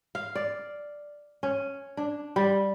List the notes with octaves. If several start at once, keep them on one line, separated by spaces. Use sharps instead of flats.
F5
D5
C#4
D4
G3